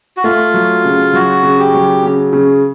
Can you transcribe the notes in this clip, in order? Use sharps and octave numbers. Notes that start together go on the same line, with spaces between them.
F#4
A3 F4
F#3
C#3
F#3 F#4
C#3
G4
F#3
C#3
C#3